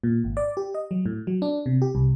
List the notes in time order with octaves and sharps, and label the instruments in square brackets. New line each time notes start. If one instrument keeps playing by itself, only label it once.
[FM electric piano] A#2
G#1
D5
G4
D#5
F#3
A2
F#3
D4
C3
G4
C2